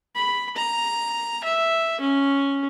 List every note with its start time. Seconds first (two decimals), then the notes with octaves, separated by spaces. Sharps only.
0.16 B5
0.57 A#5
1.44 E5
2.01 C#4